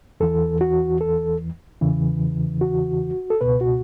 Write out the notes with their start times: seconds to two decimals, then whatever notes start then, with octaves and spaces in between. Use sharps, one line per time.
0.20 E2 E3 A4
0.61 F#4
1.01 A4
1.81 E2 C#3 E3
2.61 F#4
3.30 A4
3.41 C#2 B2 B4
3.61 F#4